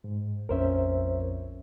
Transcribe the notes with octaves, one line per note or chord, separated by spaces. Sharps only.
G#2
A#1 F2 C#4 A#4 C5 E5